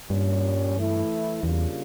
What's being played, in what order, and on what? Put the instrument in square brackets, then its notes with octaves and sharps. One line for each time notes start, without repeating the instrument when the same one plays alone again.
[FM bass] G2 [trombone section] A#2 G3 C#4
[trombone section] E3 A3 E4
[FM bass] E2 [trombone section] C#3 G3 A#3 D4 F4